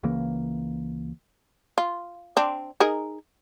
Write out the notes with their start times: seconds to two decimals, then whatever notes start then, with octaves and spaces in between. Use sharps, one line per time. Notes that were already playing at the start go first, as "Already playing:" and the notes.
0.03 C#2 C#3 E3 A#3
1.78 F4
2.37 C4 D4
2.80 D#4 G#4 A#4